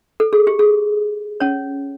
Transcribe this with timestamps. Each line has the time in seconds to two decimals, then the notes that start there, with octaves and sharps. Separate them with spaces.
0.20 A4
0.33 G#4
0.47 G4
0.59 G#4
1.40 C#4 C#5